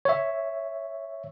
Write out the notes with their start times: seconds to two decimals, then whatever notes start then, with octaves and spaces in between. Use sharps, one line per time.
0.05 C#5 E5